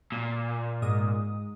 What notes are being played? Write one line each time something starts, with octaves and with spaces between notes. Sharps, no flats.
A#2
G#2 G#3 D#6